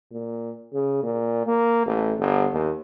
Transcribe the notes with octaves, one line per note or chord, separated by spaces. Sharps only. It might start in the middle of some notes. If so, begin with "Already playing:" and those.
A#2
C#3
A#2
A#3
A1
G1
D#2